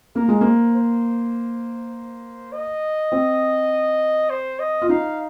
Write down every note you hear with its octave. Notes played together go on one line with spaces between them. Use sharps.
A#3 A#4
G#3
A#3 C5
C5
D#5
C4
C5
D#5
F4
D#4 F5